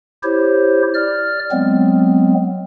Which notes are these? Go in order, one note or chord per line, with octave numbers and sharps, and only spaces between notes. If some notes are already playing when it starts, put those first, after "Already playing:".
E4 G4 C5 C#5
D5 F6
F#3 G#3 B3 C4